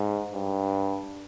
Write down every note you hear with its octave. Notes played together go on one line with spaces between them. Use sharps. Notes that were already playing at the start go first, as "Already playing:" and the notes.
Already playing: G#2
G2